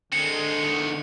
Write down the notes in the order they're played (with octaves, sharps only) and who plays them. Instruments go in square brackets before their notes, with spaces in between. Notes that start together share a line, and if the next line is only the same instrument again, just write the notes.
[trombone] D3 [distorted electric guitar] G#3 C4 [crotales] C#7
[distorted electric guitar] E2 D#3